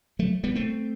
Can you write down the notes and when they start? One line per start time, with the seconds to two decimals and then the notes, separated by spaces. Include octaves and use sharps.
0.19 F#3 A3
0.44 G3 B3
0.55 A3 C4